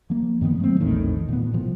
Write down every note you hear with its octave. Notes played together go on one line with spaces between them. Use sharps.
F3 A#3
G2 D#3 A#3 B3
F#3 A3 B3 C4
A#1 E2 A2 D#3
A#2 B3
A2 C3 F3